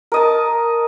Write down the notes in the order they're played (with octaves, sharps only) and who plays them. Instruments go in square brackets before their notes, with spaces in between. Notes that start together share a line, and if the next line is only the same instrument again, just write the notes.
[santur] A#4 D#5 A5